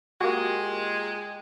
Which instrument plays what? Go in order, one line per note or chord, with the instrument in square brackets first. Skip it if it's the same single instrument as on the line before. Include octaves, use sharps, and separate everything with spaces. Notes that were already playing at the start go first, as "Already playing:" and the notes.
[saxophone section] A#2 G#3 [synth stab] A#3 F#4 [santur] G4